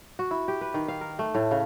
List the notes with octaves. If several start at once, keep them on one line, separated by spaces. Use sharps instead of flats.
F#4
E4
G4
B4
D#3
F5
A#4
A3
A2
C#3